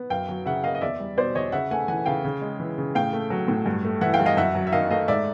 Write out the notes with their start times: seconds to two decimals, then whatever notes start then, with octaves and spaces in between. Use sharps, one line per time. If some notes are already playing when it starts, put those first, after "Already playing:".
Already playing: B3
0.10 F#2 F5 G5
0.29 F#3
0.46 C#3 E5 F#5
0.64 A#3 D#5 F5
0.75 D#5
0.81 E2 D5 E5
1.00 G3
1.17 B2 C5 D5
1.35 E2 C#5 D#5
1.52 C#3 E5 F#5
1.71 A3 F#5 G#5
1.88 E3 F#5 G#5
2.06 C#3 F5 G5
2.25 C#3
2.41 G#3
2.60 E3
2.78 C#3
2.95 A2 F5 G5
3.13 A3
3.30 F#3
3.48 A2
3.66 G2
3.85 A3
4.01 E3 E5 F#5
4.14 F5 G5
4.20 G2
4.26 D#5 F5
4.37 F#2 E5 F#5
4.55 F#3
4.67 E5
4.72 D#3 D#5 F5
4.90 A3 D#5 F5
5.08 G#2 D5 E5